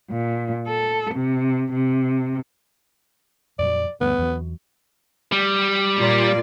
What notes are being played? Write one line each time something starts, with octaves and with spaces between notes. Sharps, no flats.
A#2
A4
C3
C3
F2 A#2 F#3 D5
D2 G2 B3
E2 F#3
G3
A#2 F4 D5